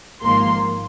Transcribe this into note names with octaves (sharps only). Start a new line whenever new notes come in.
G#1 G#2 F3 A#3 C6